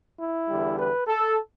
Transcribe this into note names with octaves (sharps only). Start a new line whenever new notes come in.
E4
E2 D3 G3
B4
A4